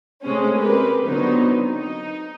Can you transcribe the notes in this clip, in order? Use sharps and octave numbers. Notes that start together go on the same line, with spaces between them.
C3 G#3 A3 C4 C#4
C4 G4 A#4 B4
D3 F#3 B3 C4 D#4
D#4